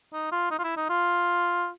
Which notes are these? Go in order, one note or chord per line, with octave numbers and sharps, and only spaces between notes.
D#4
F4
D#4
F4
E4
D#4
F4